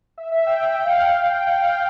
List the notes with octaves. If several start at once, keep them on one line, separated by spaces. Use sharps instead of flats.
E5
E5
G5
G5
F5
G5
G5
F5
G5